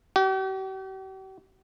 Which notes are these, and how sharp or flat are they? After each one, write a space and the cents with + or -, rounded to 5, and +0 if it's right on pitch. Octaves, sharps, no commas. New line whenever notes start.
G4 -45